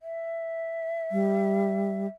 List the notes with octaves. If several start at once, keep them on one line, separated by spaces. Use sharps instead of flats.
E5
G3